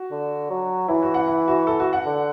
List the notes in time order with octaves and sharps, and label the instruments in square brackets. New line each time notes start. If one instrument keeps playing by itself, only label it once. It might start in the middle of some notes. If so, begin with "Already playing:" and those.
Already playing: [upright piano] F#4
[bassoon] D3
F#3
[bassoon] E3 [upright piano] E4
[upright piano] F#4
F#5
E4
F#4
A4
F#4
F#5
[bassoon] D3